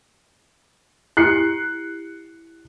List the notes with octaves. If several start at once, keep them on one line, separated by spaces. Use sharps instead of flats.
E4 G4 F#6 C7 C#7